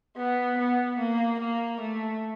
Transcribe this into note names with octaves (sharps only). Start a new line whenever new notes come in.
B3
B3
A#3
A#3
A3